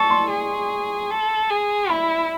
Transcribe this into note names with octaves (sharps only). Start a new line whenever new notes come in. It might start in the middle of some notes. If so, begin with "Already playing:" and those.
Already playing: A4 C#6
C6
G#4
A4
G#4
E4 B5